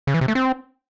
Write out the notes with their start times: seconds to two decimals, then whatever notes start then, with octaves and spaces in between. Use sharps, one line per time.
0.07 C#3
0.14 E3
0.21 C3
0.28 A3
0.35 C4